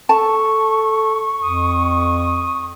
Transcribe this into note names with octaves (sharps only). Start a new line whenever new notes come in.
A4 A5 C#6
F2 D#6